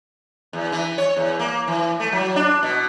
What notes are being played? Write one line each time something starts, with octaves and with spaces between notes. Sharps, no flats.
E2
E3
C#5
E2
A#3
E3
A3
F#3
D4
B2